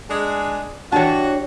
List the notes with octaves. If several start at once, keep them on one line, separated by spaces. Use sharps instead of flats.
G#3 D4 G#4
E3 D4 F#4 G4 C#5 A5